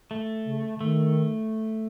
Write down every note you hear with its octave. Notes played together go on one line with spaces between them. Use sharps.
A3
C#3
C#3
D#3 A3